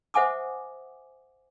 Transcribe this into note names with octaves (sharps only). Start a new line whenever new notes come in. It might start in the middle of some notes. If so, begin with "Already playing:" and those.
C5 E5 F#5 G#5 D6 D#6